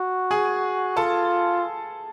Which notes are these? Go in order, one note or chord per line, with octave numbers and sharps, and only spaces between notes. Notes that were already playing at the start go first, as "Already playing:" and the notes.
Already playing: F#4
G#4 G#5
F4 A4 A5